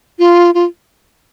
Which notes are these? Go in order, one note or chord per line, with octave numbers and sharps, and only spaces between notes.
F4
F4